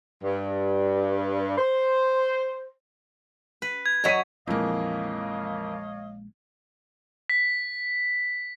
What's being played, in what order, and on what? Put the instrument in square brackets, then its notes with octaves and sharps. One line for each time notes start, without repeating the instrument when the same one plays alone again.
[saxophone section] G2
C5
[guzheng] B4
[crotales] G#6
[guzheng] F#3 A#5 [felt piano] D#5 B6 D#7
[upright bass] A#1 G#3 [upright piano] F2 E3 A#3 [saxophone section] C#5 D#5 F5
[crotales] B6